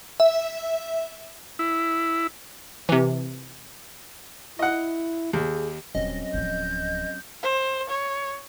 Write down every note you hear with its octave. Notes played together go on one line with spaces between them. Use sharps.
E5
E4
C3 E3
E4 D#5 F#5
D#2 G#4
D#1 F#3 C4 C#4 D#5
D1 F3 G6
C5
C#5